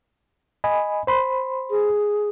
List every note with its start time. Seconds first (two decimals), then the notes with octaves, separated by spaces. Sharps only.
0.64 D#5 G#5 B5
1.07 C5 B5 C6
1.70 G#4